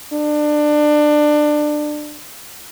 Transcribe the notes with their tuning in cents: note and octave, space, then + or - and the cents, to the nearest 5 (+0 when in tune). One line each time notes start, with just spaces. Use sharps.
D4 +25